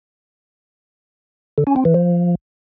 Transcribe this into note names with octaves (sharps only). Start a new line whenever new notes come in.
D3
C#4
C4
E3
F3